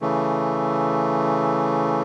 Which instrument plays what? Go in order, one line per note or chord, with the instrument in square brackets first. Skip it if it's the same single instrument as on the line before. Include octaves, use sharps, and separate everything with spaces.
[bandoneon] C#3 E3 A3